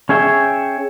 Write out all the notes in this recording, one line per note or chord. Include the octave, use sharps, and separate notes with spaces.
C#4 G#4 C#5 E5 G5